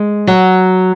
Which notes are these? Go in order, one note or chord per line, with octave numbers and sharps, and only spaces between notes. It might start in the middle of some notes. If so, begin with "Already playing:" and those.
Already playing: G#3
F#3